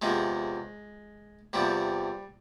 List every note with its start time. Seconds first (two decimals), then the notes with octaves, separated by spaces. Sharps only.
0.02 E2 C3 F3 G#3
1.53 E2 C3 F3 G3